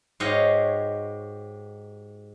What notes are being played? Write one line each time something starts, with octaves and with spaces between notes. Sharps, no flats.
G#2 F#4 G4 C#5 D#5 F5